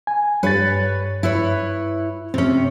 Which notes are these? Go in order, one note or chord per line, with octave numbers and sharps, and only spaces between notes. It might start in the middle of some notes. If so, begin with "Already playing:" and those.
G#5
G2 B4 C#5 A6
E4 B4 C#5
C3 C4 C#4